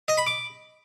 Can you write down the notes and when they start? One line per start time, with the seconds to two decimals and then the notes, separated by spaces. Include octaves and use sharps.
0.08 D#5
0.17 B5
0.27 D6